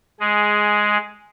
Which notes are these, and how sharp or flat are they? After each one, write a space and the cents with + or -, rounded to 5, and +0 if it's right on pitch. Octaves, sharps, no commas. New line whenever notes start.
G#3 +5 G#4 +0